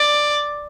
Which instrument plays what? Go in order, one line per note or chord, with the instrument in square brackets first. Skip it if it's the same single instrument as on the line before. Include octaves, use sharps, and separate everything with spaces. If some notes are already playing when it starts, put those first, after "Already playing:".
Already playing: [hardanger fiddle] D5